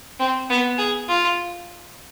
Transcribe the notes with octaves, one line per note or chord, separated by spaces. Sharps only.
C4
B3
G#4
F4